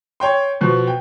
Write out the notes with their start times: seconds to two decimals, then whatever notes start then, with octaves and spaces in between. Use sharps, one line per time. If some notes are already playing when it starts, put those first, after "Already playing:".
0.20 C#5 G5 C6
0.61 B2 F3
0.87 G5